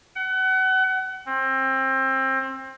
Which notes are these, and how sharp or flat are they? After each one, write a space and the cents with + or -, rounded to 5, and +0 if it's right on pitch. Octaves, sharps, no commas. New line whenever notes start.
F#5 +30
C4 +25